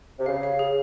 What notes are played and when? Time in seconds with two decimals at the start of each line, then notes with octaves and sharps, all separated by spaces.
0.18 C3
0.26 C#3 F5
0.43 F5
0.59 G#4